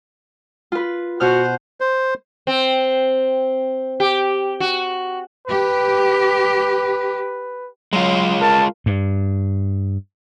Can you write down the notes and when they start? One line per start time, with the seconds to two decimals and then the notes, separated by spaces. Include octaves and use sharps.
0.72 F4 B4
1.20 B2 F#4 C5 F6 F#6
1.81 C5
2.47 C4
4.00 G4
4.60 F#4
5.47 G4 B4
7.93 F#3 G#3 F4
8.42 A#4 A5
8.86 G2